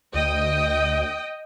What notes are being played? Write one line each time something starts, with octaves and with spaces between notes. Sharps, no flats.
D2 D#5 G5